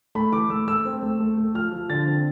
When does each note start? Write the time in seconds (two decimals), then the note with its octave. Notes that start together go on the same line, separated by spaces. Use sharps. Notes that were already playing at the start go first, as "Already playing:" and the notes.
0.15 A3 B5
0.32 E3 D6
0.50 A3 E6
0.68 A3 E6
0.85 C4
1.03 A3
1.20 A3
1.38 A3
1.54 F3 F6
1.72 F3
1.90 D3 A6
2.07 C4